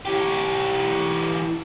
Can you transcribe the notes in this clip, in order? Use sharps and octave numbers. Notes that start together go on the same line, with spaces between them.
E3 G4